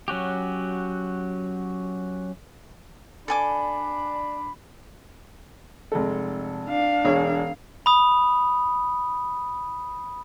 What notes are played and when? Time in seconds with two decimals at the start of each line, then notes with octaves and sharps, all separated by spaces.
0.08 F#3 C#4 F#4 G4
3.28 D4 A4 G#5 B5 D6
5.92 F1 G#3 A4
6.69 D4 F5
7.05 E1 G#4 C#5
7.86 B5 D#6